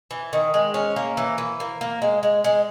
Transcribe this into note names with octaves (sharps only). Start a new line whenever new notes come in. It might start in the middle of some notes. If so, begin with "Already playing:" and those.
E3
D#3
G#3
C#4
A#3
E3
E3
A#3
A#3
G#3
G#3
G#3